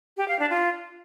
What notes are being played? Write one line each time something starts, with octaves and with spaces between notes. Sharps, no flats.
G4
F5
D4
F4